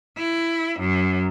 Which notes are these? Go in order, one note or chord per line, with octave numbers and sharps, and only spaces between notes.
E4
F#2